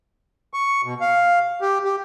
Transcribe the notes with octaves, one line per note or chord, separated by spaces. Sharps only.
C#6
B2
F5
G4
G4